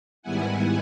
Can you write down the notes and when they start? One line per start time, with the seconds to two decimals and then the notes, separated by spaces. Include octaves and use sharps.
0.22 G#2 D#3 G3 B3 E4 F#5 G#5